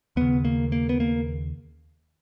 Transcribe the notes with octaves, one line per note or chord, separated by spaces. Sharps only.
D#2 C#3 B3
A#3
A#3
B3
A#3